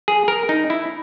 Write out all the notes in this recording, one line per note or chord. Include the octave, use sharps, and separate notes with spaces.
G#4
A#4
D#4
E4